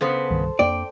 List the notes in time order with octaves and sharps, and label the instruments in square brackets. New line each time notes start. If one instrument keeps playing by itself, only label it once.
[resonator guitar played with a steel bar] C#3 B3 [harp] A4 C5
[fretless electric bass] C2 G2 D#3
[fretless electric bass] F2 A#3 D4 [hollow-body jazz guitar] D5 [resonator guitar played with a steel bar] G5